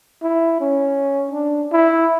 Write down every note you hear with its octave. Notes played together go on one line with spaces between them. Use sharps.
E4
C#4
D4
E4